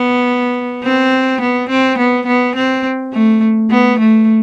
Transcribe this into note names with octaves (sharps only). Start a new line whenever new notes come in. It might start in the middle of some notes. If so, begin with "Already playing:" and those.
Already playing: B3
C4
B3
C4
B3
B3
C4
A3
B3
A3